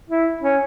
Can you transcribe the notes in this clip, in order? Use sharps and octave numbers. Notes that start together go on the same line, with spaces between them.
E4
C#4